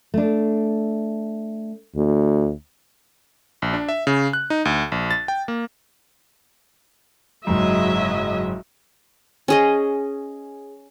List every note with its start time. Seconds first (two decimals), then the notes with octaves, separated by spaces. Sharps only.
0.14 A3 D4
1.96 D2
3.62 A#1
3.74 D4
3.89 E5
4.07 C#3
4.33 F#6
4.50 D#4
4.65 D2
4.92 A#1
5.11 A6
5.28 G5
5.48 A#3
7.47 F#1 G#2 F#3 D#5 E5
9.48 C#4 G#4 D#5